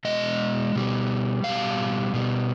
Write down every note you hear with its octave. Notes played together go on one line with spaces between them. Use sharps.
B2 G#3 D#5
B2 G3
B2 G3 F5
B2 G3